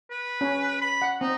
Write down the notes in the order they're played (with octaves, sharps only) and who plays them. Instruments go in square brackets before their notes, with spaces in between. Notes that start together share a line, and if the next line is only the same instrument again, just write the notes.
[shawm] B4
[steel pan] C#4
[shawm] B5
[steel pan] F#5
[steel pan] C4 [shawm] D#4